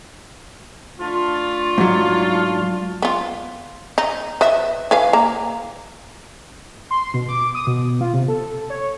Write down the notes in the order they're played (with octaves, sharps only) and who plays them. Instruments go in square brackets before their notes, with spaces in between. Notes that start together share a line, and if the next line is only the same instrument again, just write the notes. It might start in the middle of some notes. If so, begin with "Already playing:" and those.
[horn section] A3 D4 F4
[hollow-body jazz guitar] G#2 F#3
[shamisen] B3 F4
D#4
B4 D#5 E5
E3 B4 F5
A#3 A#5
[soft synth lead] C6
B2
D6
D#6
B2
F4
C3
A4
C#5